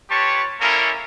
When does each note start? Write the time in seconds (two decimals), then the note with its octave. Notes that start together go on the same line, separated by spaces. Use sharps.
0.10 F4 G4 B4 C#5 A5 C#6
0.61 G#3 A#3 C#4 E4 A4 A#4